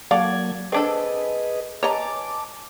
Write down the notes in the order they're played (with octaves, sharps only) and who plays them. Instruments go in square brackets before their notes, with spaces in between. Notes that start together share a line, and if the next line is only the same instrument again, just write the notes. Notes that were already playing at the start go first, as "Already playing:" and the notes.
[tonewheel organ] F#3 A#3 G#6 [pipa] F#4 A4 D5 [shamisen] F5
[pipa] C4 D4 A4 [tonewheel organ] G#4 B4 D#5
[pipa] E3 [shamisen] C#5 D#5 A#5 [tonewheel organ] A5 D6